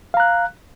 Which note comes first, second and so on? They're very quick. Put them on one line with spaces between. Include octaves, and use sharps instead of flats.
F5 A#5 F#6